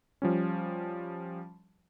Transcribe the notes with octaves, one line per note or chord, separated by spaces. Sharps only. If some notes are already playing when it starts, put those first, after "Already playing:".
F3 G3 C#4